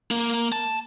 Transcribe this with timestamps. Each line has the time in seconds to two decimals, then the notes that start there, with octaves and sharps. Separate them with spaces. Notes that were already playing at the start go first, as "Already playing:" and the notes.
0.11 A#3
0.52 A5